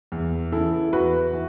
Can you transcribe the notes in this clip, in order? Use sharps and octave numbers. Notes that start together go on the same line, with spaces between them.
E2
C#3 E3 E4 A4
E2 F#4 B4
E3